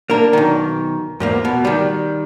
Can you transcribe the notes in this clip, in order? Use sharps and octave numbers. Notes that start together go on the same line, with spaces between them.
A#3 D4 A#4
B1 D#3
E2 G#2 A#3
B2
D#3 G3